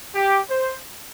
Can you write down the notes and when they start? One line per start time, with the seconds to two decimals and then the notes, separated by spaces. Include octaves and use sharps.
0.14 G4
0.50 C5